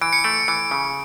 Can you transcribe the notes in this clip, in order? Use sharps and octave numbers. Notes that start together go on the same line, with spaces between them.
E3 D7
C#7
A3 D7
E3 C#7
C#3